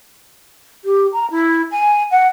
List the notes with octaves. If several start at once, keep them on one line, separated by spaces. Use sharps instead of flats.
G4
A#5
E4
G#5
F#5